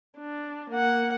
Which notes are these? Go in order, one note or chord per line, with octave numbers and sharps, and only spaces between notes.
D4
A#3 F#5